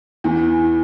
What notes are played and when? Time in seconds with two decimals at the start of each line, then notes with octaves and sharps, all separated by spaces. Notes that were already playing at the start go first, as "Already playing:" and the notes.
0.24 E2 E3